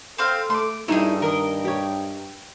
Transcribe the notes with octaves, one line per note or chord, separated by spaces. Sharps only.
C4 A4 C5 F5
A3 C6 D6
G2 G3 A3 D#4 E4 G#4
D#3 A#4 D#5
G4 C#5